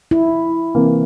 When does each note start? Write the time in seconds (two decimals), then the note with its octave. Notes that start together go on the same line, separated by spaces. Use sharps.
0.11 E4
0.75 C3 E3 A#3